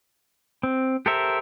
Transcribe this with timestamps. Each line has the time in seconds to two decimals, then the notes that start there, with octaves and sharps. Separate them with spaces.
0.63 C4
1.06 G4 A4 A#4 C5 E5